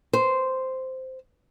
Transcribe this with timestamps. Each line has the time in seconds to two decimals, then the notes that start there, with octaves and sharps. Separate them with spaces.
0.13 C5